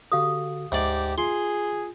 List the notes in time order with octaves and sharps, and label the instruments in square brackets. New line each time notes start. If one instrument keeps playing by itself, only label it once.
[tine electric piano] D3 F#4 A4 [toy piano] G4 F5 D#6
[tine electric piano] D2 [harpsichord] G#2 D5 [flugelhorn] G4 [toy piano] E5
[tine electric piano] F4 [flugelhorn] G#4 [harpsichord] C6